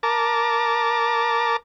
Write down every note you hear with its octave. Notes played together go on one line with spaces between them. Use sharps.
A#4 A5 D6